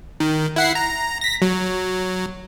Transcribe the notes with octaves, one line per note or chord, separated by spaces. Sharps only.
D#3
E4 F#5 C7
A#5
A#6 B6
F#3